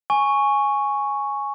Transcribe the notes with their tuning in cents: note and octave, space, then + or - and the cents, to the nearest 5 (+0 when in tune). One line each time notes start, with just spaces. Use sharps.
G#5 +0 C#6 +0